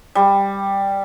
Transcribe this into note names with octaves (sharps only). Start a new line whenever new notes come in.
G3